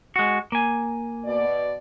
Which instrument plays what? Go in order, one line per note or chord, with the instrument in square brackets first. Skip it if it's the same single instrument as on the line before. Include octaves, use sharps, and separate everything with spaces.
[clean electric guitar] G#3 F#4
A#3 G#5
[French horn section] B2 D5